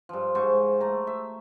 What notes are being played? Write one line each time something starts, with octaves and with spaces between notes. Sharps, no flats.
G2 F3
G#2 C5 C#6
A3 A#5
E5